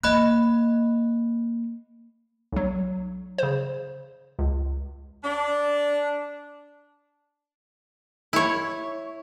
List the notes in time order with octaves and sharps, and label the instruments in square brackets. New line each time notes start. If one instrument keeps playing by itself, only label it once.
[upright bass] A#3 [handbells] D#5 B5 F#6
[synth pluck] B1 F#3
C#3 C5
C#2
[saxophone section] D4
[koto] E4 C#5